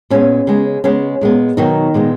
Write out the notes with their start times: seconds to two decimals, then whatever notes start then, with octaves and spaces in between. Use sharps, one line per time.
0.10 A#2 G#3 B3 C#4
0.47 C#3 G#3 B3
0.84 C#3 G#3 B3 C#4
1.21 A#2 G#3 B3
1.57 B2 D#3 F#3 B3 D#4
1.94 A#2 G#3 B3